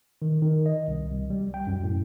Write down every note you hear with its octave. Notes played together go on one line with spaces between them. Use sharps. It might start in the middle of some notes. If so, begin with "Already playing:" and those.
D#3
D#3
D#5
C2
C2
G3
G5
F#2
A2